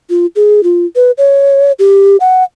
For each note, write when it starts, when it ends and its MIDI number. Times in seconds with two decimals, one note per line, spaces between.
0.10 0.26 65
0.36 0.63 68
0.63 0.86 65
0.96 1.11 71
1.18 1.72 73
1.79 2.17 67
2.20 2.44 78